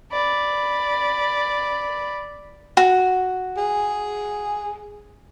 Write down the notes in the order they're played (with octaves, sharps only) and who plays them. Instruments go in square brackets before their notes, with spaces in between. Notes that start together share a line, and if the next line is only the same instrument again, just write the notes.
[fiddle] D5 B5
[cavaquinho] F#4
[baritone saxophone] G#4